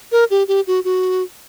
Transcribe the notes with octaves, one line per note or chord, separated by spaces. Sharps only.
A#4
G4
G4
F#4
F#4